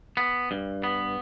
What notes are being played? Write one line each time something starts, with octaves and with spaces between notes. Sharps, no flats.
B3
G2
B3